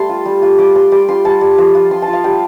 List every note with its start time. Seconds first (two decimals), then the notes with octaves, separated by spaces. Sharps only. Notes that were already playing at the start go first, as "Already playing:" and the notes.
Already playing: G3 A3 A5 C6
0.09 F4
0.25 G3
0.42 F4
0.59 G3 D6
0.75 G3 C6
0.92 G3 D6
1.08 F4 C6
1.25 G3 A5
1.41 G3
1.58 F3
1.75 F4
1.91 F3 C6
2.02 A5
2.08 F4
2.13 F5
2.24 G3 G5